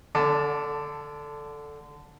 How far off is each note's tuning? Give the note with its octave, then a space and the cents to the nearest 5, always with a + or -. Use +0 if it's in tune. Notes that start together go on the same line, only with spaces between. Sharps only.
D3 +0 D4 -45 A5 +15